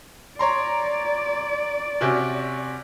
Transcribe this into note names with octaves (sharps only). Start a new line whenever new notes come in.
C#5 D5 A#5 C6
C3 C#4 F#4